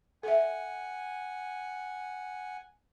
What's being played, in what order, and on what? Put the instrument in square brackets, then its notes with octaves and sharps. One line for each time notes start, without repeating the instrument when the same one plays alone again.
[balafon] A4 E5 [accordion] F#5 G#5